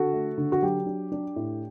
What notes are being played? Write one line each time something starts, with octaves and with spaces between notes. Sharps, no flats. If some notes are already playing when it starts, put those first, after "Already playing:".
Already playing: D3 F#4 A4
A3
D3
F#4
F#3 G4
D4
D4
A2